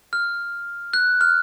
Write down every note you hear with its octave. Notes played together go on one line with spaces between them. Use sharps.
F6
F#6
F6